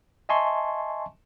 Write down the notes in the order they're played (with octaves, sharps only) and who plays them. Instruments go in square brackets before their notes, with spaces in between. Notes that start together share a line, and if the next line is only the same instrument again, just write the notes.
[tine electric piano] D#5 E5 G#5 A5 C6 C#6